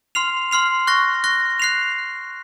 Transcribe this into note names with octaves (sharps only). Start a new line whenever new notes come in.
C6 F6 C7 F7
C6 F6 C7 F7
C#6 F#6 A#6
C#6 F#6 A#6
F#6 C7 F7